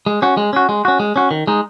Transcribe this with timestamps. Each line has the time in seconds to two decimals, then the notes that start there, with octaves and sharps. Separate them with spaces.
0.06 G#3
0.22 C#4 F#4
0.37 G#3
0.53 C#4 F#4
0.69 G#3
0.85 C#4 F#4
1.00 G#3
1.16 C#4 F#4
1.31 D#3
1.47 G#3 D#4